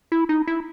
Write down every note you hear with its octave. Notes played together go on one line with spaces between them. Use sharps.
E4
D#4
E4